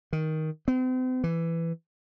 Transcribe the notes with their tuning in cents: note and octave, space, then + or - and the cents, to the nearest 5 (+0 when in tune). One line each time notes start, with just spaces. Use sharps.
D#3 +10
C4 -40
E3 +10